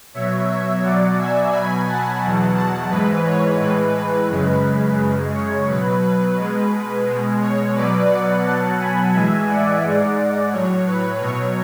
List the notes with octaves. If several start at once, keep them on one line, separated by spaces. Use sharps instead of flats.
B2 F#3 C#5 E5
C#5 E5
B2 F#3 D5 F#5
E5 G#5
B2 F#3 G#5 B5
F#5 A5
E2 B2 F#3
F#5 A5
G#2 E3 G#3 B4
C#5
A2 E3 G#3 B4
B4
F#2 C#3 G#3
F#2 C#3 G#3
C#5
B2 F#3 B4
B4
B2 G#3
B2 G#3
C#5
B2 F#3 B4 D5
D5 F#5
B2 F#3 F#5 A5
G#5 B5
A2 E3 G#3 E5 G#5
D5 F#5
G#2 G#3
A2 F#3 C#5
B4
B2 F#3 C#5